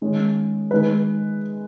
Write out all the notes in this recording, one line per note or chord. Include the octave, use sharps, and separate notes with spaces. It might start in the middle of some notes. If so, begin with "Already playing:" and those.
D#3 G#3 C#4
D#3 G#3 D#4 B4